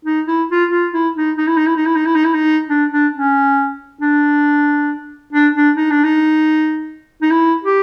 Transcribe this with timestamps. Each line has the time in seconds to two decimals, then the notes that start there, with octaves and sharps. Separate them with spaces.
0.05 D#4
0.28 E4
0.49 F4
0.71 F4
0.93 E4
1.16 D#4
1.37 D#4
1.47 E4
1.57 D#4
1.67 E4
1.76 D#4
1.86 E4
1.96 D#4
2.05 E4
2.15 D#4
2.25 E4
2.34 D#4
2.69 D4
2.92 D4
3.13 C#4
4.01 D4
5.33 D4
5.55 D4
5.77 D#4
5.91 D4
6.04 D#4
7.22 D#4
7.31 E4
7.64 G4